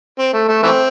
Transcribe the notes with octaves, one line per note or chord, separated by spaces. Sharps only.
C4
A3
A3
E3 A3 C4